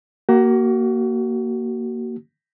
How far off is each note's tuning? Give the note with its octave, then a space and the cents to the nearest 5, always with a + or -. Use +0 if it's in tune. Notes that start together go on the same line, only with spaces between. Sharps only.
A#3 +0 F#4 +30